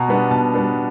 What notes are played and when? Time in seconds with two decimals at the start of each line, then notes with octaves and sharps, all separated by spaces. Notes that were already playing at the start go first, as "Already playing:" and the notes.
Already playing: B2 A#5
0.08 G3 B3 D4
0.31 B2 A5
0.54 G3 B3 D4